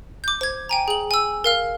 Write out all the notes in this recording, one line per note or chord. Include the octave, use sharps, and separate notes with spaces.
D6 G6
C5 G#6
G5 G#5 A#5
G#4 F#7
G#5 E6
A#4 F5 F6